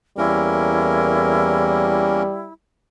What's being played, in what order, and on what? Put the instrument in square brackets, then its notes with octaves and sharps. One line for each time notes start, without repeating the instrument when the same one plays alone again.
[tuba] E2 [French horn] G3 [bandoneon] A#3 C#4 A#4 [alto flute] E4